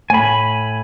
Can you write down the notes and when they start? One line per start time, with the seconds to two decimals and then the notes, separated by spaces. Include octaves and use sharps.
0.10 A2 G#5 B5